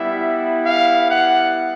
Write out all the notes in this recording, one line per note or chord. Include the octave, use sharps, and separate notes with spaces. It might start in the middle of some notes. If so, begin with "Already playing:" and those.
Already playing: G3 B3 E4 E5
F5
F#5